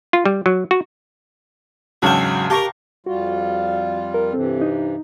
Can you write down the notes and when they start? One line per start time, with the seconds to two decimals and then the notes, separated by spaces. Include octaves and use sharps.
0.13 F4
0.26 G3
0.46 F#3
0.71 F#4
2.02 E2 G#2 C#3 F#3 D4 E5 F5 G5
2.50 G4 A#4 A5 A#5 C#6
3.06 F2 G3 F4 F#4
4.14 A#4
4.33 G2 C3 E3 C4 A4
4.61 D#4